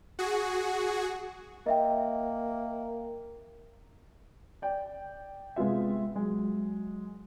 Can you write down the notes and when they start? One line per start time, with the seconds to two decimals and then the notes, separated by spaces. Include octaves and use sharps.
0.19 F#4 G#4
1.66 A#3 D#5 E5 G5
4.62 D5 G5
5.56 C3 G#3 B3 F4 E5
6.16 F#3 G#3